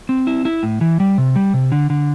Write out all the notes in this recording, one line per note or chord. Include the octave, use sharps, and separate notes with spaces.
C4
E4
E4
A2
E3
G3
C3
G3
C3
D3
D3